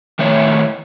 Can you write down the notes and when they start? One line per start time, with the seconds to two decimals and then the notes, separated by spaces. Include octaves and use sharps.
0.19 D#3 A3 E4 C#5